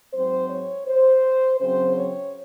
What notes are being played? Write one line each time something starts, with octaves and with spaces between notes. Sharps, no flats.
G#2 F#3 C4 C5
C#5
C5
C#3 F#3 C4 C5
C#5